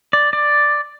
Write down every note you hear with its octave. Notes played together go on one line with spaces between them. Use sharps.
D5
D5